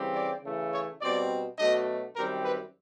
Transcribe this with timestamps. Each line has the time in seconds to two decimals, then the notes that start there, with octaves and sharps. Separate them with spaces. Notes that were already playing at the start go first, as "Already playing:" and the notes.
Already playing: C#3 E3 G3 C4
0.14 D5
0.43 C#3 E3 A3
0.72 C#5
1.00 B2 G3 C4 D5
1.57 B2 F#3 A3 D4 D#5
2.15 F#2 D#3 G3 C4 A#4
2.43 B4